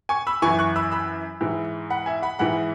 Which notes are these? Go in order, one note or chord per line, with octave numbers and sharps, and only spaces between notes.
G#5 C#6
B5 E6
F#2 E3 G#5 C#6
C#6 F#6
B5 E6
B5 E6
G#2 E3
F#5 B5
E5 G#5
F#5 B5
G#2 E3 F#5 B5